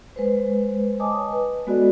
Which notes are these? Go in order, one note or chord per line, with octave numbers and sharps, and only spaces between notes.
G#3 B4 C5
C#5 D#5 G#5 A5 D6 D#6
B4
G#3 B3 F#4 A4 D5 D#5